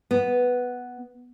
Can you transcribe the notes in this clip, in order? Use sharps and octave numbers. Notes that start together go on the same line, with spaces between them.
B3